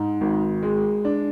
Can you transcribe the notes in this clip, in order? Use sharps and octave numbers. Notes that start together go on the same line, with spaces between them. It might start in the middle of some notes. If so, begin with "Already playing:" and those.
Already playing: G#2
G#1
G#3
D4